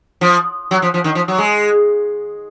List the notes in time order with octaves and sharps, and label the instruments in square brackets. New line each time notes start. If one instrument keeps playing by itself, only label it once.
[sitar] F3
F#3
F3
F3
D#3
F3
F#3
G#3